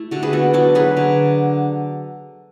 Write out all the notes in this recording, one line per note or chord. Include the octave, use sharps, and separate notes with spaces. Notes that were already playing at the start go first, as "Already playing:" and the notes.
Already playing: A3 E4
D3 F#4 A4
G#4 B4
B3 F#4 A4
F#3 F#4 A4
F#3 G#4 B4
D3